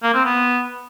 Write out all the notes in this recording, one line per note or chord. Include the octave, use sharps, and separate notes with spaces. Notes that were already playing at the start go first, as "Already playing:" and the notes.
A#3
C4
B3